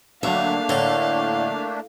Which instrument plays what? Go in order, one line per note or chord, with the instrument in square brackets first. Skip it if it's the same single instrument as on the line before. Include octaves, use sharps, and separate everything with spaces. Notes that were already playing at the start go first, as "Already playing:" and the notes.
[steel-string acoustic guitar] D2 [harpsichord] F#3 E5 [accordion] A3 A#3 D4 [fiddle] F5
[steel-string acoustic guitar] A2 [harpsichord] D3 A4 A5